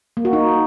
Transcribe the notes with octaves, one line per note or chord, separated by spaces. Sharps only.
A#3
F#4
D#4